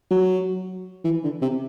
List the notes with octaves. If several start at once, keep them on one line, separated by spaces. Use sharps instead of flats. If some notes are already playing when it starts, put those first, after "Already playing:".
F#3
E3
D3
C3